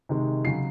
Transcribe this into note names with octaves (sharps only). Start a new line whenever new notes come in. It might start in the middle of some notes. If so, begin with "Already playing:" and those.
C3 D#3 G#3
C#3 F#3 C7